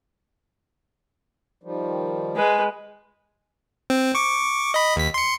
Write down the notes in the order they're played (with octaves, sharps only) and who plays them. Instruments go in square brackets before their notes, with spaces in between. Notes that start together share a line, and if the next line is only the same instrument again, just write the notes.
[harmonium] D#3 F3 G3
[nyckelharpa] G#3 B4
[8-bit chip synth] C4
C#6 D6
D#5 B5
D#2 B6
C6 C#7